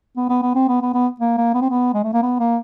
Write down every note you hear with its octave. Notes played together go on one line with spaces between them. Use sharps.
B3
B3
B3
C4
B3
B3
B3
A#3
A#3
B3
C4
B3
G#3
A3
A#3
B3
A#3